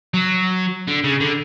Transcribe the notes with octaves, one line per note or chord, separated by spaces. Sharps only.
F#3
D3
C#3
D3